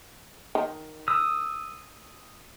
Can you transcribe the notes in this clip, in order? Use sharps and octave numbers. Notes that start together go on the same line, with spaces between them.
D#3
D#6 E6